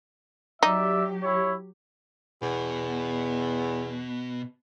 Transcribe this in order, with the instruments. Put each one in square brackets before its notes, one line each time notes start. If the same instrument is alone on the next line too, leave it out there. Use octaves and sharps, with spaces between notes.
[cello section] F#3 G4 [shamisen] D#4 [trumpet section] D5 E5
[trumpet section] E4 C#5
[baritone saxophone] E2 [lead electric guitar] B2